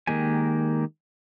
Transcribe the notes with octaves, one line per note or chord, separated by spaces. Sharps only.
D#3 G#3 A#3 G4 G#5